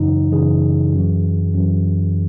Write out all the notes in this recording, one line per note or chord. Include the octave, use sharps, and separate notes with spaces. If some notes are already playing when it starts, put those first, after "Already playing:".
Already playing: F#2 C#3 E3 D#4
F#2 C#3 E3 G#4
F#2 E3
F#2 E3